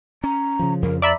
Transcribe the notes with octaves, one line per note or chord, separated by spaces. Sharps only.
C#4 A#5
C#3 F3
F2 A#4
D5 E5 A#5 B5